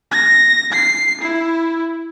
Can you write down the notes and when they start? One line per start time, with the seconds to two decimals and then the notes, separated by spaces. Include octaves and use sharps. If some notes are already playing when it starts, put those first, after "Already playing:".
0.11 A#6
0.73 C7
1.21 E4